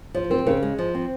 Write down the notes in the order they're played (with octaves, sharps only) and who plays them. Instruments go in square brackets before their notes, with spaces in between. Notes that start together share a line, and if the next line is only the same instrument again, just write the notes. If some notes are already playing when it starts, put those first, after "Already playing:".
[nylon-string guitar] F3 [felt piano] C5
[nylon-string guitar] C4 [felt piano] A#4
[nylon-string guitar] C#3 [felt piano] A#4
[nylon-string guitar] G#3
F3
C4